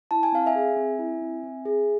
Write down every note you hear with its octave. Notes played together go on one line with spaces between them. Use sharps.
E4 A5
G#5
C4 F5
E5 G#5
G#4
C4
E4
C4
C4
G#4